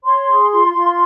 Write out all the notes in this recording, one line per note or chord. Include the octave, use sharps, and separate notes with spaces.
C#5 C6
G#4
F4
F4